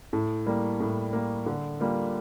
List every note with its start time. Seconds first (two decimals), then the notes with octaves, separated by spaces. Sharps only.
0.13 A2
0.46 G3 A#3
0.80 A2
1.13 G3 A#3
1.46 D3
1.80 G3 A#3 F4